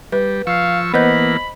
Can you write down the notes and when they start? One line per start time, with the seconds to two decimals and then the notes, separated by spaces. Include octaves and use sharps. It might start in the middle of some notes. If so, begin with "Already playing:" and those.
0.12 G3 B4
0.47 F3 F5 C#6 E6
0.94 E3 A#3 B3 C5 D#5 B5 G6